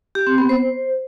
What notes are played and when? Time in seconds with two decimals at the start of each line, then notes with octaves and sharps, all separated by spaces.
0.15 G4
0.27 C4
0.38 B3
0.49 C5